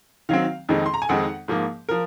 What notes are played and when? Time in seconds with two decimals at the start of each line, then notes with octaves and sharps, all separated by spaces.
0.29 D#3 F#3 C4 F5
0.69 F2 D#3 G#3 C4 D#4
0.86 C6
0.94 A#5
1.02 G#5
1.09 F2 D#3 G#3 C4 D#4 F#5
1.48 G#2 F3 A#3
1.89 F3 A#4